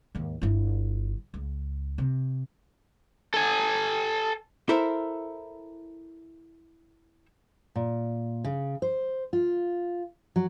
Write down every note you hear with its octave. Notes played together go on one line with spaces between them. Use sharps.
D#2 G#2
G1 E4
C#2
C3
A4 G#5
E4 A4 A#4 C5 E5
A#2
C#3
C5
F4
F#3